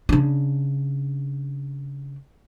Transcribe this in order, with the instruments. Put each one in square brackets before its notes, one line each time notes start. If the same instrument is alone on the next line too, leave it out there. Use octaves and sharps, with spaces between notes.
[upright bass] C#3 D4